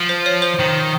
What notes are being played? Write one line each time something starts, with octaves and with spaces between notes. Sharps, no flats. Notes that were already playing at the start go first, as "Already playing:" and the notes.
Already playing: F3
C5
C#5
C5
D#3